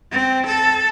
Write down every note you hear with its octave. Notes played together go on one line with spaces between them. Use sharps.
C4
A4